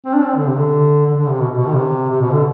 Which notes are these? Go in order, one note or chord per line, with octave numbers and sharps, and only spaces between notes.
C4
D4
C4
D3
C3
D3
D3
D3
C3
B2
B2
D#3
C3
C3
B2
D3